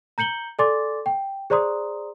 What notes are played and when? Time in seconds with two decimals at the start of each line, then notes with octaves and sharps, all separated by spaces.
0.18 A#5 G6 C#7 F#7 G7
0.59 A4 D5 G#5 C6 D6 A6
1.06 G5
1.50 G#4 C5 D5 A#5 C6 D#6